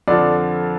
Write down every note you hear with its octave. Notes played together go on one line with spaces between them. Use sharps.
F2 D3 F3 D5